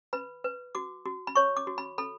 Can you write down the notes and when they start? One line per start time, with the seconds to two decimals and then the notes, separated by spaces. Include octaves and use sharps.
0.13 B4 B5
0.44 B4
0.75 F#4 D6
1.05 F#4
1.27 B5
1.35 C#5 C#6
1.57 D6
1.67 F#4
1.78 B5
1.98 A4 B5